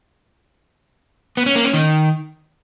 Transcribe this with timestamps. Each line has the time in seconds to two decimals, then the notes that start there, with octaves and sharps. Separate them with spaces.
1.37 B3
1.46 C#4
1.55 A#3
1.64 C#4
1.73 D#3